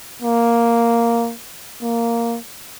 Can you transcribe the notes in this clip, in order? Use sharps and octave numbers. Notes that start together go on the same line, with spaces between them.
A#3
A#3